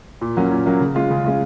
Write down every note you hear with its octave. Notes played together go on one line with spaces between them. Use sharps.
A#2
F#3 A#3 C#4
A#2
F#3 A#3 C#4
C#3
G#3 C#4 F4
C#3
G#3 C#4 F4